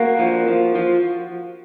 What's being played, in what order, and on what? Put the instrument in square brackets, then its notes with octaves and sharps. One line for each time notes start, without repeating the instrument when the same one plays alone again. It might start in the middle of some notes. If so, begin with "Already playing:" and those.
Already playing: [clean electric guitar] A#3 F#4
F3
F3
F3